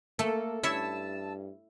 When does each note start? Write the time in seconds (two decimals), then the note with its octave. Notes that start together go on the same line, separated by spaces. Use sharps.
0.19 A3 A#3 A4
0.63 G2 E4 C#5 E5 A5 E6